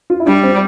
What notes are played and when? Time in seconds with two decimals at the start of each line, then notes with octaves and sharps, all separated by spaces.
0.10 F4
0.20 E4
0.26 G3 D4
0.43 C4